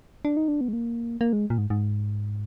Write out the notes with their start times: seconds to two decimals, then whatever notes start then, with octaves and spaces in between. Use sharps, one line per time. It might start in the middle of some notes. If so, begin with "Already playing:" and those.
0.25 D4
0.37 D#4
0.48 D4
0.61 B3
0.68 G#3
0.73 A#3
1.21 A#3
1.33 G#3
1.50 A#2
1.58 G#2
1.70 G#2